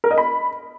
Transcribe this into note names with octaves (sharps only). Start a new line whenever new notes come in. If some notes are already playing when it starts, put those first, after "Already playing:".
A#4
D#5
B5